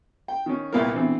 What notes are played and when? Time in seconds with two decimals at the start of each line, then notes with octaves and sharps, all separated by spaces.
0.28 G5
0.46 D#3 C#4
0.73 C2 A#2 A#3 B3 E4 A#4
0.94 B2 D3 E3 C4